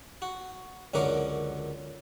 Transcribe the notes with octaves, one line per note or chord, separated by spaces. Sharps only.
F#4
C#2 F#2 D3 F#4 A#4 D6